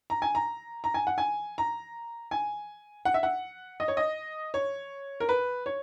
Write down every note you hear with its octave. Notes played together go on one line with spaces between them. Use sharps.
A#5
G#5
A#5
A#5
G#5
F#5
G#5
A#5
G#5
F#5
E5
F#5
D#5
C#5
D#5
C#5
A#4
B4
C#5